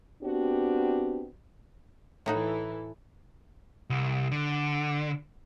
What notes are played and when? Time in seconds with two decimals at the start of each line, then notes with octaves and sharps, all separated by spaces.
0.23 B3 C4 D4 F#4 G4
2.26 A2 E3 D#4 E4 F#4 A4
3.90 C2
4.32 D3